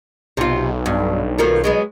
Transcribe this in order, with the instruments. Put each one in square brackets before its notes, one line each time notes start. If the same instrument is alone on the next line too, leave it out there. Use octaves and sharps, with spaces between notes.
[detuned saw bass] B1 [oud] C3 F4
[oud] G2
D#3 F3 A#3
F#3 G#3 B3